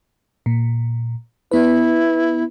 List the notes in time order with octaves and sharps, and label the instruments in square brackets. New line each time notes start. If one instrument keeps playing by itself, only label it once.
[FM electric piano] A#2
[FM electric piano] B3 B4 [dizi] E4